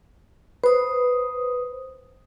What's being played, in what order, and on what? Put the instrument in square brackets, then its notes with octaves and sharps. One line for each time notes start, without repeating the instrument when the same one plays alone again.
[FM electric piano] B4 [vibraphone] C5 D#6